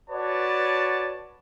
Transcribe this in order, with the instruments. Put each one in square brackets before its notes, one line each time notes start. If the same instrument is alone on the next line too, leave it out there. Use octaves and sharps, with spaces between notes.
[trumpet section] F#4 B4 C#5 D5 A5